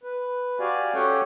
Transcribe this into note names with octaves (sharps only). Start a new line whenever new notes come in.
B4
F#4 G4 D5 F5 G#5
C#4 G4 A4 C#5 F#5 G5